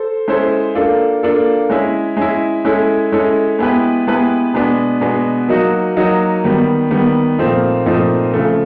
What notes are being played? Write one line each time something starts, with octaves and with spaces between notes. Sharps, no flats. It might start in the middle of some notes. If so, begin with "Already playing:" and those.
Already playing: A4 C5
G#3 C#4 E4 A4 C5
A#3 D4 F4 A4
A#3 D4 F4 A4
G#3 C#4 E4
G#3 C#4 E4
G#3 C#4 E4 A4
G#3 C#4 E4 A4
G#3 B3 E4 G4 B4
G#3 B3 E4 G4 B4
B2 G#3 B3 D4
B2 G#3 B3 D4
F#3 A#3 D#4 F#4
F#3 A#3 D#4 F#4
D#3 G3 B3
D#3 G3 B3
A#2 F3 A3 C4 D#4
A#2 F3 A3 C4 D#4
C#3 F3 A3